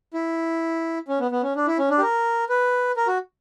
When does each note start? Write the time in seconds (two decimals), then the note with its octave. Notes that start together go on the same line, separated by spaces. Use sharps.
0.14 E4
1.08 C#4
1.20 B3
1.31 B3
1.43 C#4
1.56 D4
1.67 E4
1.79 C#4
1.90 D4
1.98 G4
2.02 A#4
2.49 B4
2.97 A#4
3.07 F#4